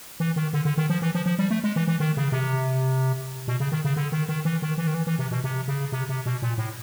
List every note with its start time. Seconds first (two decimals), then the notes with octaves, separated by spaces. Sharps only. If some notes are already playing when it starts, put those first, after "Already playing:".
0.20 E3
0.36 D#3
0.53 D3
0.65 D3
0.78 D#3
0.90 F3
1.02 E3
1.15 F3
1.26 F3
1.39 G3
1.51 A3
1.64 G#3
1.76 E3
1.88 E3
2.00 D#3
2.17 C#3
2.32 C3
3.48 B2
3.60 C#3
3.72 D#3
3.85 C#3
3.96 D3
4.12 D#3
4.29 D#3
4.45 E3
4.62 D#3
4.78 E3
4.87 D#3
4.94 E3
5.07 E3
5.19 C3
5.31 B2
5.44 C3
5.68 C#3
5.92 C3
6.09 C3
6.26 B2
6.42 A#2
6.58 A2